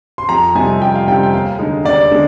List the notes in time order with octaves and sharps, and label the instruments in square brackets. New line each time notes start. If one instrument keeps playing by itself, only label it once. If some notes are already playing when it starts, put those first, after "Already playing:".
[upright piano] C6
F2 A#5
C3 G3 C4 D#4 G#5
F2 G5
F5
C3 G3 C4 D#4 G5
G5
D#2 F5
D3 G#3 D#4
D#2 D5
D3 G#3